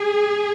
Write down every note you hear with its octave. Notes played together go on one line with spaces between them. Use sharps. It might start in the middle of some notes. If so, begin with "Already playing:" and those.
Already playing: G#4